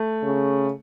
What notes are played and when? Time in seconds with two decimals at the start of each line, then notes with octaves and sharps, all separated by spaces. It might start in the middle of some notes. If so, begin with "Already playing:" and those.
Already playing: A3
0.23 C#3